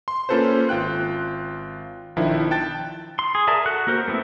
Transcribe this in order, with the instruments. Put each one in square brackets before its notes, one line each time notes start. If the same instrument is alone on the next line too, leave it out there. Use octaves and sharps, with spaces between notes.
[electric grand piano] C6
A#3 C#4 F4 A4 B4 C5
G#1 F4 G5 F#6
B1 D#3 F3 D4 E4
G5 A5 F#6 A6
[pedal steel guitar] C6
G#4
G#4 A#4 D5 E5 A5
F#4 A4 F#6
A#3 F#4 A#4 C5
A3 B3 C4 E4